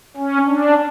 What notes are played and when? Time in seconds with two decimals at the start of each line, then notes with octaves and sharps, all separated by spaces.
0.17 C#4
0.47 D4